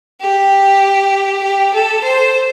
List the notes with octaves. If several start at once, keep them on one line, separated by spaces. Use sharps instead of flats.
G4
G4
A4
C5